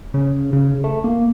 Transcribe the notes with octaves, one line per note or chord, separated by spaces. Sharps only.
C#3
C#3
A3
A#3